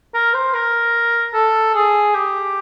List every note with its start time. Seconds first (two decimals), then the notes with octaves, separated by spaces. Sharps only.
0.14 A#4
0.34 C5
0.54 A#4
1.34 A4
1.75 G#4
2.14 G4